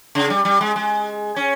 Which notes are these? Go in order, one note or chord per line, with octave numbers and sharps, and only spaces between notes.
C#3
G3
G3
G#3
G#3
C#4